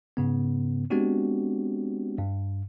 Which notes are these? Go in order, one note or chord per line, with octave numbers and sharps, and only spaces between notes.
G#2 C#3 B3
G#3 B3 C4 D4 F#4 G4
G2